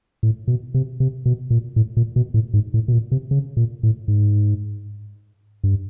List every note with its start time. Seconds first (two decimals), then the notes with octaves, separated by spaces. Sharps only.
0.23 A2
0.48 B2
0.74 C3
1.00 C3
1.26 B2
1.50 A#2
1.76 A2
1.97 A#2
2.16 B2
2.34 A2
2.54 G#2
2.74 A2
2.88 B2
2.92 A#2
3.12 C3
3.31 C#3
3.57 A#2
3.83 A2
4.08 G#2
5.64 G2